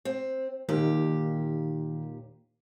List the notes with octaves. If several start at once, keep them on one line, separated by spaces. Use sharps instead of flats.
C4
D#2 A#2 D#3 G4